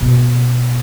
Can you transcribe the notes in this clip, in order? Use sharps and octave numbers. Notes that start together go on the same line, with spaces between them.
B2 B3